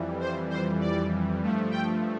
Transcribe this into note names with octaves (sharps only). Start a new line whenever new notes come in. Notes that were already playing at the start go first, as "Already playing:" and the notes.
Already playing: F2 E3 G3
C5
C5
D5
G2 F3 A3
G5